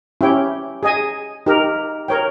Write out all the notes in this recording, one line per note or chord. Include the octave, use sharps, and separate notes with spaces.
C#4 E4 G4 C#5 G5
G#4 D#5 G#5
D#4 G4 A#4
A#4 C#5 G5